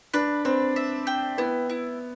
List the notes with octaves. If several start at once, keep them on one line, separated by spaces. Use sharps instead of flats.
D4 B4
C4 B4
E5
G5
B3 E4
E4